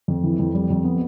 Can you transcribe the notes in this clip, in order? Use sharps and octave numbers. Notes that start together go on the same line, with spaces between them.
F2
E3
F2
G3
F2
B3